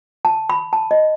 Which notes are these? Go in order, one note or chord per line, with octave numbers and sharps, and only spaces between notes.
A5
B5
A5
D#5